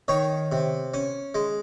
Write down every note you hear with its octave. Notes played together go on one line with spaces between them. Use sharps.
D#3 C#5 C#6
C3
C#4
G#3